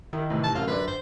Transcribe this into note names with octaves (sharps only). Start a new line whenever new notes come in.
D#3 E4
A2 C3 E3
A5
F#2 F4
D3 B4 D5
C5